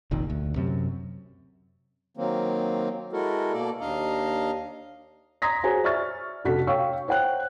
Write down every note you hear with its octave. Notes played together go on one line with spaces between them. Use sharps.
F1 A#1 D#3
D2
F#2 C3
D#3 F#3 A#3 C4
G#3 E4 F#4 A4 A#4
B2 A#3 A4 D5
D#2 D4 D#5 F5 A#5
A#5 C6 D#6 G#6 A#6 B6
F#4 G#4 C5 C#5 G#5 A#5
D5 E5 C#6 F6 A6
F1 D4 F#4 A4 B6
C#5 F5 G5 C#6 E6
C5 C#5 F#5 G5 F#6